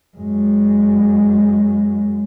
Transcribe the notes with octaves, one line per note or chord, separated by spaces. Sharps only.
F#2 G#3